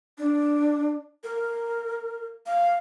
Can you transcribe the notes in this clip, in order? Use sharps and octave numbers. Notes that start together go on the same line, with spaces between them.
D4
A#4
F5